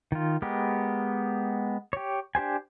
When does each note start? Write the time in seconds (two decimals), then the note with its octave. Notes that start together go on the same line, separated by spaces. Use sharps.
0.12 D#3 F4
0.42 G#3 B3 G4 A#4
1.93 G4 C#5
2.35 D4 G4 C5 G#5